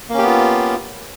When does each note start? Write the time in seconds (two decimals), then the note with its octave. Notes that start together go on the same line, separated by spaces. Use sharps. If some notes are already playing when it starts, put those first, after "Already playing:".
0.09 A#3
0.14 C#4
0.18 G4
0.23 B3
0.27 F4